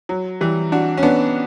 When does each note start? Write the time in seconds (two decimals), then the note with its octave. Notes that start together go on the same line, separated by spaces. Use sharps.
0.09 F#3
0.41 E3 G3
0.72 D4 F#4
0.97 C#4
1.03 B3 D4